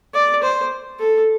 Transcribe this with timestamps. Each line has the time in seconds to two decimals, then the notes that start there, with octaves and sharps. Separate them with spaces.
0.14 D5
0.43 C5
1.00 A4